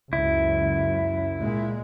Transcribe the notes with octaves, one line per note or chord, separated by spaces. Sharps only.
C#2 F#2 E4
A#2 G#3